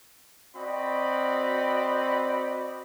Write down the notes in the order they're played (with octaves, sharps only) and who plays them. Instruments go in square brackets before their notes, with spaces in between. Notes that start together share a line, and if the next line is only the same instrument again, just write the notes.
[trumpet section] C4 F#4 D5 D#5 B5